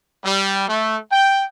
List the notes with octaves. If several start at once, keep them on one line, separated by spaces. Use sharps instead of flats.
G3
A3
G5